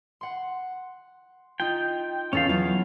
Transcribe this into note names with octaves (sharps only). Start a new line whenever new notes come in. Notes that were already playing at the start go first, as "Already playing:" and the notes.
F#5 C6
D#4 F4 G5
E2 C#4 A4 F5 A6
E2 F#3 F4 F5